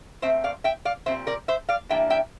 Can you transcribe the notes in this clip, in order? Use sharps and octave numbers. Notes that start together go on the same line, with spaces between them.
A#2 A3 C4 C5 E5
D5 F5
E5 G5
D5 F5
A#2 G3 C4 C5 E5
A#4 D5
C5 E5
D5 F5
E3 G3 A#3 D4 E5 G5
E5 G5